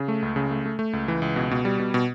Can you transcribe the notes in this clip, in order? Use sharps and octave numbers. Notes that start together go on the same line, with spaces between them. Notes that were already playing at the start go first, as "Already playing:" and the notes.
Already playing: C#3
A3
C#2
C#3
A3
A3
A3
C#2
E3
C#2
B2
B2
G3
B2
B2